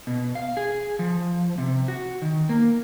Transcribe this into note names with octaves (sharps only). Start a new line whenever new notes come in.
B2
F5
G#4
F3
C3
F#4
D#3
A#3